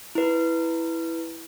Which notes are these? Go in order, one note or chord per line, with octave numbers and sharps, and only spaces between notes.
E4 B4